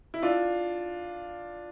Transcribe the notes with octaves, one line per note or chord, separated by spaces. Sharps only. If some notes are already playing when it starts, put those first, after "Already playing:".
E4
D4 F4